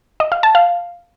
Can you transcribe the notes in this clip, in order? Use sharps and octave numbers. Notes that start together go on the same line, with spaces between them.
D#5
F5
A5
F5